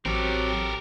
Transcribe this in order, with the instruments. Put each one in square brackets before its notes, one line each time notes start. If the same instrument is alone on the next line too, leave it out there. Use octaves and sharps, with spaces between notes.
[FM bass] A1 [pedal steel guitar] F#3 C4 [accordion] G4 [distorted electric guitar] A4 A#4